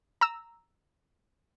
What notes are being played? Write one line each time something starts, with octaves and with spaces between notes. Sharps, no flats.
A#5 E6